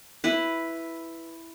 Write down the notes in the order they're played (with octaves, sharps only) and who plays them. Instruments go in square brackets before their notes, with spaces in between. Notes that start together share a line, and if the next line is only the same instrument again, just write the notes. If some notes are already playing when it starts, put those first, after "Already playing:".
[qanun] E4 B4